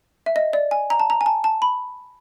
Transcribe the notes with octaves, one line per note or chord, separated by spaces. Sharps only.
E5
D#5
D5
G#5
A#5
A5
A#5
G#5
A5
A5
B5